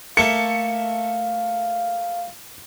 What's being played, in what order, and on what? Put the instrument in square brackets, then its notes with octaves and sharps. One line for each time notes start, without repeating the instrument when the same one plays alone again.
[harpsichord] A3 A#3 A4 [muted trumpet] F5 [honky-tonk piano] C#7